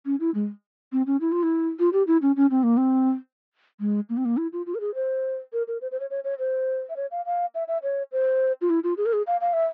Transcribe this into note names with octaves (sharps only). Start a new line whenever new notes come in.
C#4
E4
G#3
C4
C#4
E4
F4
E4
F4
G4
E4
C#4
C#4
C4
A#3
C4
G#3
A#3
C4
A#3
E4
F4
F4
A#4
G#4
C5
A#4
A#4
C5
C5
C#5
C#5
C#5
C5
E5
C#5
F5
F5
E5
E5
C#5
C5
F4
E4
F4
G#4
A#4
G#4
F5
F5
E5